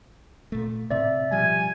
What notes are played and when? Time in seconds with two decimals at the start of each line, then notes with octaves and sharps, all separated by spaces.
0.52 A#2 A3
0.91 A2 C3 C4 D5 E5
1.32 B2 F3 G3 G#5